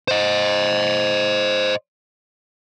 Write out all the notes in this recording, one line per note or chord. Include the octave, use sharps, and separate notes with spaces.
C5 D#5